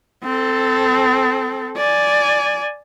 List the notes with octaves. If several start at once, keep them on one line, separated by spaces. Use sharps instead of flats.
C4 A4
D5 G#5